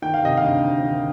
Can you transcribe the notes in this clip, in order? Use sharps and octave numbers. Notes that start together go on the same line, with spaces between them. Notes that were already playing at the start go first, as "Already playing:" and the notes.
D#3 G5
F5
C3 D#5
D2 F5
D2
D#3